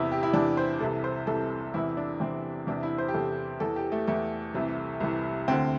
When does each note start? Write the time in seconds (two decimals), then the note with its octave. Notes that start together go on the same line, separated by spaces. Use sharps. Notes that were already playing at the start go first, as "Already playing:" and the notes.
Already playing: E2 C3 E3 E4
0.11 G4
0.23 E4
0.33 E2 C3 E3 D4
0.57 C5
0.80 C2 C3 E3 A4
1.04 C5
1.27 C2 C3 E3 A4
1.74 E2 C3 E3 E4
1.97 D4
2.20 E2 C3 E3 C4
2.67 E2 C3 E3 D4
2.83 E4
2.98 C5
3.08 G4
3.14 E2 C3 E3 A4
3.60 E2 E3 A4
3.76 G4
3.92 A3
4.07 E2 E3 A3
4.54 C2 C3 E3
5.00 C2 C3 E3
5.48 D2 D3 C4